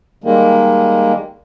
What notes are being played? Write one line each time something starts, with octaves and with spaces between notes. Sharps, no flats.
D#3 G3 G#3 A#3